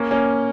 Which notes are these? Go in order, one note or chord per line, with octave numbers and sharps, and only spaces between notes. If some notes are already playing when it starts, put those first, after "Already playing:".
Already playing: A#3 C#4
A#3 C#4